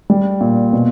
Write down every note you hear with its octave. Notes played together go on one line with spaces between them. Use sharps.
G3
A#2
B2